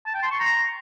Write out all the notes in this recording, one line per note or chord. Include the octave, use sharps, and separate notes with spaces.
A5
G5
C6
C#6
A#5